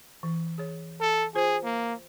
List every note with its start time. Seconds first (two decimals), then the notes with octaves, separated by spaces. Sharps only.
0.23 E3
0.58 G#4 C#5
1.01 A4
1.35 F4 G#4 C5
1.64 A#3